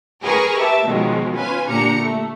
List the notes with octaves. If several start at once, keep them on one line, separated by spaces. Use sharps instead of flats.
G#4 A#4 B4 G#5 A#5 C#6
G4 E5 A5
B2 D#3 F3 F#3 G#3
C#4 F4 B4 G#5
A#2 D3 D4 G4 A#5 C#7
A3